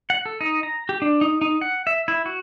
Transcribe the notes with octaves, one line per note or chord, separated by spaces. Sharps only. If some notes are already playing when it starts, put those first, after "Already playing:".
F#5
A4
D#4
A#5
G4
D4
D#4
D#4
F#5
E5
E4
F#4